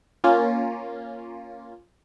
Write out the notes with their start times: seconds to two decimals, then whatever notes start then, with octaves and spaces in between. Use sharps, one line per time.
0.24 A#3 C#4 F4